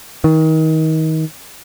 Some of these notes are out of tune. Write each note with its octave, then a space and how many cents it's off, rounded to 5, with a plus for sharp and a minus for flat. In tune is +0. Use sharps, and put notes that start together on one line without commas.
D#3 +30